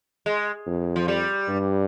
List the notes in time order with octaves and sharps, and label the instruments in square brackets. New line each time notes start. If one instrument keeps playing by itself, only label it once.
[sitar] G#3
[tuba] F2
[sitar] F3
G3
[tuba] G2